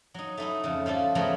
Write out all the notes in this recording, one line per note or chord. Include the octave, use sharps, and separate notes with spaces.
F#3 D#4
A3 D#4 E4
F2 C#3
F3 G3 F4 A4
C#3 F3 F#3 A3 B3